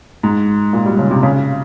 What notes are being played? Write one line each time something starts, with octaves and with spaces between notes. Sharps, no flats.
G#2
A#2
G3
C#3
C3
C#3